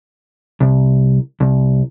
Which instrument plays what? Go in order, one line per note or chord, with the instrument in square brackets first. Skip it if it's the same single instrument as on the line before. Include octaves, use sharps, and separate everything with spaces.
[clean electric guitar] C2
C2